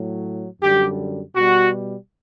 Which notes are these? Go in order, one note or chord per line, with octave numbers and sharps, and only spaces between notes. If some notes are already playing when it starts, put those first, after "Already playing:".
Already playing: A2 F#3
F#2 D3 G3 G4
B2 G3 F#4